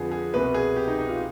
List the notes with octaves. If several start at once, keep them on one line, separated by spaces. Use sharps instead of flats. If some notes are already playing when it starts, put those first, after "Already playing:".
Already playing: F2 D3 F3 G#4 B4
G#4
C2 B2 B4
G#4
G4
D#4
D#4
F4